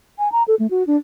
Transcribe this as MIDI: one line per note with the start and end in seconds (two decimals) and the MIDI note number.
0.19 0.31 80
0.32 0.43 82
0.48 0.55 69
0.59 0.67 57
0.70 0.86 66
0.87 0.97 62